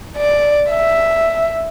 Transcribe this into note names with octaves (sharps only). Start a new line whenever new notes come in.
D5
E5